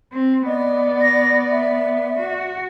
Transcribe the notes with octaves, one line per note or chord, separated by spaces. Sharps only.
C4
B3 D5 D#5
A#6
E5
F#4